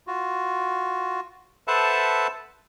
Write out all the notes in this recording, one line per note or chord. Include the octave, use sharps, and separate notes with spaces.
F4 F#4
A4 B4 C5 E5 F#5 A5